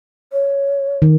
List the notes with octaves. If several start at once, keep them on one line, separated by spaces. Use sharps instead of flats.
C#5
D#3